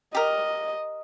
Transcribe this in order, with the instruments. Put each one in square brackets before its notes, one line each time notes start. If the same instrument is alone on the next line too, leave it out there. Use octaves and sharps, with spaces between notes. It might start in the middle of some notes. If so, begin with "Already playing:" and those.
[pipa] G4 A#4 [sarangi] D#5